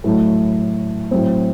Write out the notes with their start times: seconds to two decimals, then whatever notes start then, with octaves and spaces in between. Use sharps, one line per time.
0.04 A2 F#3 A3
1.11 A2 F#3 C4